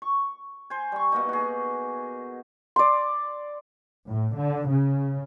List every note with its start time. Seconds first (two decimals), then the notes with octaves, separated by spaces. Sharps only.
0.02 C#6
0.70 C5 G#5
0.92 G3 C#6
1.12 B2 A#3 D#4
1.29 F#4 G#4
2.76 D5 C6
4.08 A2
4.37 D3
4.69 C#3